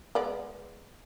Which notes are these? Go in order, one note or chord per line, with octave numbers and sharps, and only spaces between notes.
G#3 B3 D5